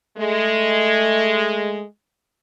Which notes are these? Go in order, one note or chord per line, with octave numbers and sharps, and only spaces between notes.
G#3 A3